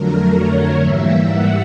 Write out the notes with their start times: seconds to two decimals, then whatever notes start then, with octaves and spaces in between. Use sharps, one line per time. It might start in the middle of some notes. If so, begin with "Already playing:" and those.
Already playing: F2 D3 F#3 A3 A#4
0.31 C#5
0.79 G#2 E3 G3 A#3 E5
1.27 F#5